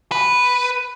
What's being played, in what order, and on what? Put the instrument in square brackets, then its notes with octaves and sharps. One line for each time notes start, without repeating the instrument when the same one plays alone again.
[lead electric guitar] B4